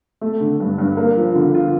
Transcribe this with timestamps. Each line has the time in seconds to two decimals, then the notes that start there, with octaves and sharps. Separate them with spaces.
0.21 A3
0.40 D3
0.60 G2
0.78 G2
0.97 A#3
1.17 F3
1.35 D3
1.55 F4